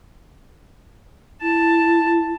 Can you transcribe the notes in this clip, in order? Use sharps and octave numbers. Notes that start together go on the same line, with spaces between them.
E4 A5